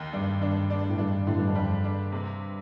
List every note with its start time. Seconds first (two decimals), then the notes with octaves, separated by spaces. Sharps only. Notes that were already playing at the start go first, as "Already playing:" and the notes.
Already playing: D#2
0.13 G2 D4
0.41 G2 D4
0.70 D4
0.90 A2
0.98 G2 D4
1.27 A2 D3
1.38 G2
1.47 F2
1.55 G2 G3
1.84 D4
2.12 C3